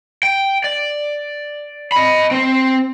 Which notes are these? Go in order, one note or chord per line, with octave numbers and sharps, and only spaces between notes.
G5
D5
D#5 B5
C4 C5